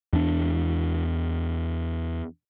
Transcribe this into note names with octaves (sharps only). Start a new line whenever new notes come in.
E2 D4